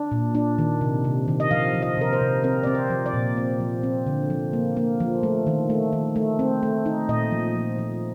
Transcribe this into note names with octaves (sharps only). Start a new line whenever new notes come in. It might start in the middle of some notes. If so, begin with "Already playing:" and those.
Already playing: D4
A#2
D4
D#3
C3
C3
D#3
D#5
F3 F5
F3
D#5
C3 A#4
C5
C3
C4 A#4
C4 D5
C5
F3
D5
A#2
C4
F3
C4
D3
F3
A#3
A#3
F3
A3
D#3
A3
D#3
A3
C4
A3
D#4
A#2 D#5
F3
F3
F3